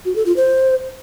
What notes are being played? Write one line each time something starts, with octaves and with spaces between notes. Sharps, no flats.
F#4
A4
F4
C5